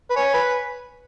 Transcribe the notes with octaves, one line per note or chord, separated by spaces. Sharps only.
B4
C#5 G#5
B4